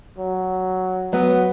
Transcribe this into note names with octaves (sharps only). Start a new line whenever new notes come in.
F#3
F#3 B3